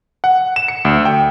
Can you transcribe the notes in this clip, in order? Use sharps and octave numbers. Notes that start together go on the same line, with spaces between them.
F#5
E7
C#7
D2
G5